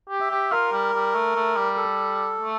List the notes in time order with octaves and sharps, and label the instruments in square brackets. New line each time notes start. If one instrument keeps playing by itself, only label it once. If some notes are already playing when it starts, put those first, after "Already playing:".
[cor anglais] G4
[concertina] E5
[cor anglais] G4
[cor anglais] F4 [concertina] A#4
[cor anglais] G3
G3
A3
A3
G3
[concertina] A4
[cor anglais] A3